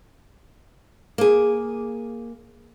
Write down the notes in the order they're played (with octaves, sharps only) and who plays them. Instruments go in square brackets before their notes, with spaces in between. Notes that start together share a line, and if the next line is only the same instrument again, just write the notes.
[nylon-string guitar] A#3 G#4